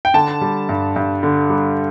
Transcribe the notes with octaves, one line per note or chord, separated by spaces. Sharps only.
G5
D3 A5
G3
G2
G2
D3
G3